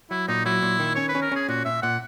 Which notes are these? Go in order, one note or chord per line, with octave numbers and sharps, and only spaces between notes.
F#3 E4
A#2 D#4
F#3 E4
A#2
D#3
C#4 C#5
B4
C#4
A#4
C#4 G#4
A#2 F#4
A#2 E5
A#2 F#5